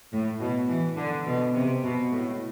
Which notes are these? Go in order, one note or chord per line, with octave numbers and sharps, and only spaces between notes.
A2
B2
E3
D3
B2
C3
B2
A2